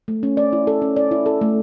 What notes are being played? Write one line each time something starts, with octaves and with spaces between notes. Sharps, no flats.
A3
C#4
D5
E4
A4
C#4
D5
E4
A4
A3